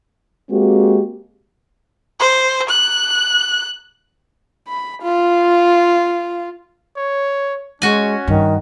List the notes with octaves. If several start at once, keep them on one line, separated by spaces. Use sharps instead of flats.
G#3 A#3 C4 F#4 G4
C5
F#6
B5
F4
C#5
G#3 C#4 F#4 G#5
G2 D#3